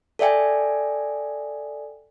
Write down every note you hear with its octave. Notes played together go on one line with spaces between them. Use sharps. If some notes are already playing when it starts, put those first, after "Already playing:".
A4 D5 E5 G5 G#5